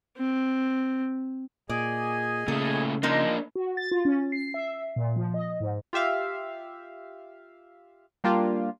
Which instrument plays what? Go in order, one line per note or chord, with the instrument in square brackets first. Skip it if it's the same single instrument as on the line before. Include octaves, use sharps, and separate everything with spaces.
[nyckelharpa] C4
[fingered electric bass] A#2 [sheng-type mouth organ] G#4 D#5 G#5 [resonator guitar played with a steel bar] D5
[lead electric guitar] A#2 A3 [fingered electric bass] C#3 [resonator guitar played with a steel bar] A4
[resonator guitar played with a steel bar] F3 G#3 D#4 [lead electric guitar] A#3 D4
[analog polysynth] F#4
A6
F4
C#4
C7
E5
A#2
F3
D#5
G#2
[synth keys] F4 G4 E5 F5
G3 A#3 D4 F4 G4